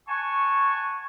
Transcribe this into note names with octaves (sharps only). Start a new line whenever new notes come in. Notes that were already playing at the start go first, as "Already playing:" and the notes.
F#5 G#5 A5 C#6